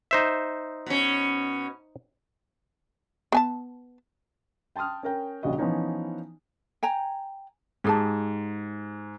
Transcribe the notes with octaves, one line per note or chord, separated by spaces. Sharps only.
D#4 C5 E5
B2 C#4
B3 G#5 A5
G5 A5 C6 D#6 F6
C#4 A#4 G5
D#1 A#1 A#2 C#3 F#4 D#5
E3 F3 B3 C#4 D#4
G5 G#5 A#5
G#2 G4 G#4 A5